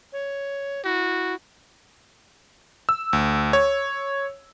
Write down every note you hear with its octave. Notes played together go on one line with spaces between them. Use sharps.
C#5
E4 F#4
E6
D2
C#5